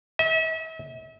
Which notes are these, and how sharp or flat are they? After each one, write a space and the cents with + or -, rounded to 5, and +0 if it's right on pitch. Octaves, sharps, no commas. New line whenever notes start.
E5 -40